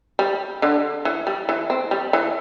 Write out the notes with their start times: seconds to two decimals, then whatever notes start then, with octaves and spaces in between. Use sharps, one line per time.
0.19 G3
0.62 D3
1.05 E3
1.27 G3
1.49 E3
1.70 C4
1.91 G3
2.13 E3